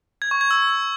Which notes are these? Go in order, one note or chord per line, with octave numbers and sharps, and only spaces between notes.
G#6
C#6
G#6
E6